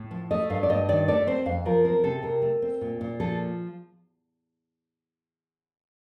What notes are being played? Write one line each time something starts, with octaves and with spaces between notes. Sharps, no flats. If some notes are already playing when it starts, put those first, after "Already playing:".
Already playing: A2
F3
A3 D#5
G2 F5
D5
G2 D#5
D#3 D5
A3 D5
C4 C5
F2 F5
F3 A#4
C4 A#4
C3 A4
C3 A#4
A3
C4
A#2
A#2
F3 A4